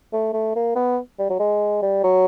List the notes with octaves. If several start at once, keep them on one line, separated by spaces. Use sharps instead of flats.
A3
A3
A#3
B3
G3
F#3
G#3
G3
F#3